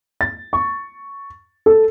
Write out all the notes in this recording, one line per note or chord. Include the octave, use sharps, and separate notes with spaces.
A6
C#6
A4